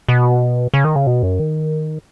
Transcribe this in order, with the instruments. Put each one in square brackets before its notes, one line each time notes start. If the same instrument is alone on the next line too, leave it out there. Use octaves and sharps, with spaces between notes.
[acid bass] B2
C#3
D#3
C#3
B2
F#2
D#3